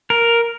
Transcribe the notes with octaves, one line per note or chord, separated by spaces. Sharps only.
A#4